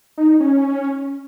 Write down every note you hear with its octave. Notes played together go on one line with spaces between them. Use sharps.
D#4
D#4
C#4